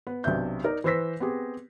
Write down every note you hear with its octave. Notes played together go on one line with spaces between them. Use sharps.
B3 B4
B1 C3 D4 E5 G6
D#4 A#4 D5
E3 B4 C5 E6 A#6 B6
B3 C4 G4 G#4